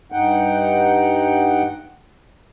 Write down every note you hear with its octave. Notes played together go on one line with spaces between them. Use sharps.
G2 D#4 F#5 G5